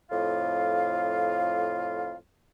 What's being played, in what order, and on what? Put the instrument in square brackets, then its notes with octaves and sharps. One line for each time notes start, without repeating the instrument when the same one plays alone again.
[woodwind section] F2 A2 F4 F5